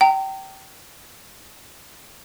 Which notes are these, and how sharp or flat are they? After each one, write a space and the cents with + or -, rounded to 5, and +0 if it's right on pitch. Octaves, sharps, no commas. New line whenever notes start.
G5 -25 A#5 -30